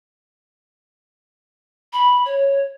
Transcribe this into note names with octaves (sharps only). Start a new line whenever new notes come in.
B5
C#5